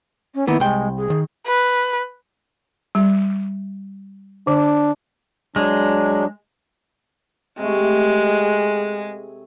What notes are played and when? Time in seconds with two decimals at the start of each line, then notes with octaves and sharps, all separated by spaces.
0.34 C#4
0.47 D#3 A#3 B3 E4
0.60 C2 G#3 G5
0.97 G#4
1.10 D#3
1.46 B4
2.95 G3
4.47 D3 D4
5.56 F#3 G#3 D4
7.59 C3 G#3 A3